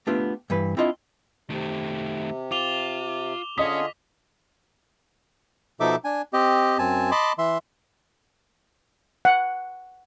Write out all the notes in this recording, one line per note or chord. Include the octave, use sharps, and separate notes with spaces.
A3 B3 D4 F4 G4
G2 E3 B4
C4 D4 E4 F4 D#5
C3 D#3 A3
F4 D6 F7 G7
D3 C#4 F4 G#4 D#5 D#6 B6
B2 F3 D#4 A4 E5 D6
D4 G#5
C4 G4 D#5
F#2 C4 G#5 A5
D#5 A5 B5 C6 D6
E3 E5 C6
F#5